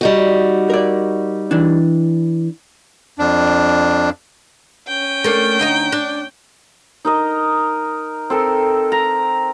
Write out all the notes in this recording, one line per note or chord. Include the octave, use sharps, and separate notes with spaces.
G3 D#4 F#4
A#4 D5
E3 D4
F2 D4
C#4 G5
A3 A#3 D4
D2 D#4 D#5
D4
D#4 A#4 D#5
C4 A4 A#4
A#5